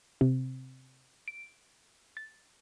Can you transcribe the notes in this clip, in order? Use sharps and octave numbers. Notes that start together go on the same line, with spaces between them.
C3
D7
A6